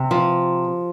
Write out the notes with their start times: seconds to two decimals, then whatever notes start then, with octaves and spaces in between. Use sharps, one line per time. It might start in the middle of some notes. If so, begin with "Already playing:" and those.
Already playing: C3
0.11 F3